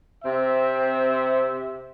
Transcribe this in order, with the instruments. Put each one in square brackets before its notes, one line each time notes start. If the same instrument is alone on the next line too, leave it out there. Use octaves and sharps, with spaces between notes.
[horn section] C3 C4 E5